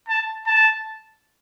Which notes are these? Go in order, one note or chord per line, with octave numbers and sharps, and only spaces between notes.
A5
A5